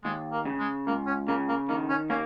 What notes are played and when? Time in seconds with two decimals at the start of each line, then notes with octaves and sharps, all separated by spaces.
0.04 D#2 G#3
0.32 A#3
0.45 C#3
0.59 G#3
0.87 C#2 A#3
1.07 C#4
1.28 C#3 A#3
1.49 A#3
1.69 D#3 A#3
1.90 C#4
2.10 A#3 C#4